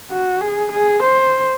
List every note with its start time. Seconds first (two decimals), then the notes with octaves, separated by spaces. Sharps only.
0.11 F#4
0.41 G#4
0.72 G#4
1.03 C5